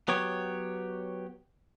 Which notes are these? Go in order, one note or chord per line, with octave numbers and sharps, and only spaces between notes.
F#3 B3 G4 C#5